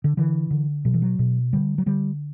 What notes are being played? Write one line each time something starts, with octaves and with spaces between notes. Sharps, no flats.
D3
D3 E3
D3
B2 F#3
E3
F#3
B2
D3 G3
F#3
D3 G3